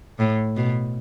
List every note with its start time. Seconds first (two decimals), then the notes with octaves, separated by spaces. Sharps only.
0.19 A2
0.56 B2